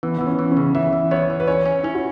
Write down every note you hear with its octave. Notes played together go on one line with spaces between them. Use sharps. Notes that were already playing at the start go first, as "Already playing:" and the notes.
E3 B3
E3 B3
C#4
E3
C#4
C#3
E3 E5
E3
B3 C#5
E3
B4
C#4 C#5
C#4
C#4 E4
F#4